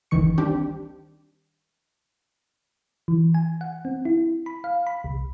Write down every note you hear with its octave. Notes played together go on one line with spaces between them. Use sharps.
G1 C#2 D#3 E3 C#6 C#7
D#3 G3 C4 D4 G4
E3
G#5
F#5
C4
E4
B5
F5
B5
C2